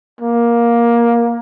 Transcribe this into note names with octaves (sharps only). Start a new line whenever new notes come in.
A#3